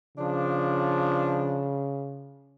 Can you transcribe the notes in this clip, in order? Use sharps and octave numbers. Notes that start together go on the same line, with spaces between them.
C#3 F3 D4